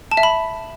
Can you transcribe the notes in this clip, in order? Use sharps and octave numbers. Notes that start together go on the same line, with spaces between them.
A5
E5
B5